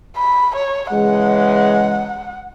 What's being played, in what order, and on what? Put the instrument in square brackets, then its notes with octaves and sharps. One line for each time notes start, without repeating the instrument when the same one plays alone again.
[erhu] B5
C#5
[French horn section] C#3 E3 G#3 [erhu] F#5